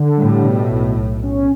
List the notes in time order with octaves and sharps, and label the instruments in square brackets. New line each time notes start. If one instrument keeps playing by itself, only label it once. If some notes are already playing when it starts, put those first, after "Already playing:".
Already playing: [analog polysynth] D3
[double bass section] A2 [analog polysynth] G3
[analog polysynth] B2
B1
B1
C#4